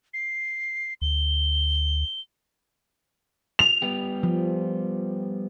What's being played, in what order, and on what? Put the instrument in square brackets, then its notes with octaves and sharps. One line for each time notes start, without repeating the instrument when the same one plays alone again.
[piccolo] C7
[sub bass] D2 [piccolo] G7
[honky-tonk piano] F7
[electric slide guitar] G3 B3 G4
[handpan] F3